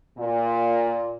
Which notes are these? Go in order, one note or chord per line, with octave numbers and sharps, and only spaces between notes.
A#2